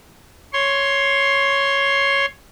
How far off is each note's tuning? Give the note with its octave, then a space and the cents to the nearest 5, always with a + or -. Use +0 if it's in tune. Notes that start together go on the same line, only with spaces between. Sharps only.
C#5 +0 C6 +15